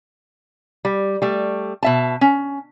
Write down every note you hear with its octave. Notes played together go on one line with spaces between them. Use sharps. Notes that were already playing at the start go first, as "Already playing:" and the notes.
G3
G3 A3
B2 E5 A5
C#4